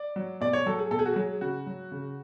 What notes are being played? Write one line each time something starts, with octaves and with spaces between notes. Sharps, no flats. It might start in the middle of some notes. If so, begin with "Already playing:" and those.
Already playing: D5
F#3
B2 D5
C#5
F#3 A4
G#4
B2 A4
G#4
F#4
F#3 G#4
C#3 F#4
F#3
C#3